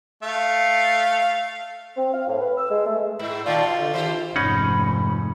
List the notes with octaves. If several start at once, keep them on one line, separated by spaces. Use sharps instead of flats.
A3 F5
C4
F5
A2
B4
E6
G#3
A3
G#2 E4
A#2 D#3 F4 D5 G5 A5
B2
D3
D#3 C#4 F4 G4 C5
F1 G#2 C#4 D#4 F#5 B5